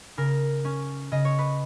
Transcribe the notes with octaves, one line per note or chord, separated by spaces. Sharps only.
C#3 A#4
C#4
C#3 D#5
C#5
B4